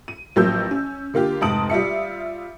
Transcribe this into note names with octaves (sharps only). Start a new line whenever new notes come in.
D#7
A1 F3 F#3 A#3 E6 G6
C#4
D3 A#3 F4 G4
F1 G#2 A5 D#6 D7 F#7
G3 F4 E5 C#7